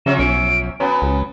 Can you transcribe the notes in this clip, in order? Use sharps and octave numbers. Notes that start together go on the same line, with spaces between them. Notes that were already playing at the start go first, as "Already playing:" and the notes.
C#3 F3 C#4 E5 E7
B1 D7
F#3 B3 C#4 G#5
C#2